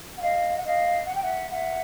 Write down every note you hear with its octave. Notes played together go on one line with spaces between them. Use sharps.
F#5
D#5 F5
F#5
D#5 F5
F#5
G5
E5 F#5
E5 F#5